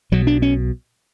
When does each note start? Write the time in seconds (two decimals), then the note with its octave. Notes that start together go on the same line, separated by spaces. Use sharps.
0.12 B1 B2 F#3
0.27 D4
0.42 C#4